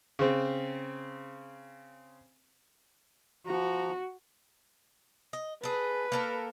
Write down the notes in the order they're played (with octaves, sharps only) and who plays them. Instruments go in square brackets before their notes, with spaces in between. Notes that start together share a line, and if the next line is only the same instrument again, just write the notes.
[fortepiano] C#3 C4
[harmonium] F3 A#5 [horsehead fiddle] F#4
[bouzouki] D#5
[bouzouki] G#4 A4 [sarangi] B4
[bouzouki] A#3 A4 A#4